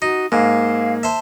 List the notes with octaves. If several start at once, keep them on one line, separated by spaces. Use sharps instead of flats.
D#4 F#4
G#2 A#3 F5
C5 E5 A5